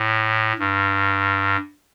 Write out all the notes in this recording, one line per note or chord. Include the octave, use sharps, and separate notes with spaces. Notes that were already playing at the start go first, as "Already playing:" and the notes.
Already playing: A2
G2